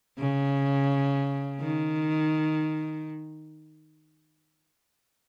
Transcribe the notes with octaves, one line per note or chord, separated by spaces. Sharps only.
C#3
D#3